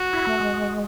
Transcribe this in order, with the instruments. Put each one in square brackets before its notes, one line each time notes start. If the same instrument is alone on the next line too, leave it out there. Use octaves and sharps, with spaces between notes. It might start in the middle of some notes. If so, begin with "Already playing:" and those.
Already playing: [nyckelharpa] F#4
[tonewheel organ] E4
A3
G#3